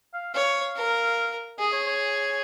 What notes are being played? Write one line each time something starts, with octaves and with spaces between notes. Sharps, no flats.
F5
C#5 F5
A#4
G#4 D#5
C#5
C#5